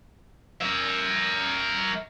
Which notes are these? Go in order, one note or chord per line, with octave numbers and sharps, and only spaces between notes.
A#4 E5